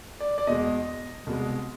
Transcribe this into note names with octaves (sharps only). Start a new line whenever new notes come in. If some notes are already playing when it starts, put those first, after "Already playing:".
D5
D5
E2 B2 G#3 D#5
C2 B2 G#3